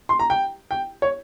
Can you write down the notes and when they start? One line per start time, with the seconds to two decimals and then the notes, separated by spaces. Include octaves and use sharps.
0.09 C6
0.19 A#5
0.30 G5
0.71 G5
1.02 C#5